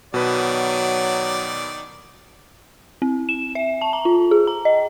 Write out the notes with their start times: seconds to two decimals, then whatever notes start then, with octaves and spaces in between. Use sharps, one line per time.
0.14 B2 D#3 F#3 B4 D5
3.02 C4
3.29 E7
3.55 E5
3.81 A5
3.93 A#5
4.05 F4
4.31 G#4
4.47 A#5
4.65 D#5